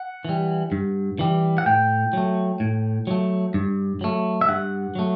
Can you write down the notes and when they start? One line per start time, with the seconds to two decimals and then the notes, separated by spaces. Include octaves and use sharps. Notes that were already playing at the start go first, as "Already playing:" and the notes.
Already playing: F#5
0.25 E3 G3
0.72 G2
1.19 E3 G3
1.58 F#5
1.66 A2 G5
2.13 F#3 A3
2.60 A2
3.07 F#3 A3
3.54 G2
4.01 F#3 A3
4.41 E5
4.48 G2 F#5
4.95 F#3 A3